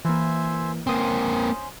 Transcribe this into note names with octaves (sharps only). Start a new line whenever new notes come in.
E3 A#3 C5 E5 G#5
A#3 C4 C#4 C5 C6 D#6